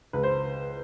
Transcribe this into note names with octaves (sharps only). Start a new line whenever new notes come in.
C#2 B4
C5